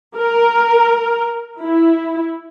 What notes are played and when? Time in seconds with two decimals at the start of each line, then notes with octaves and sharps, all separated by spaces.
0.17 A#4
1.61 E4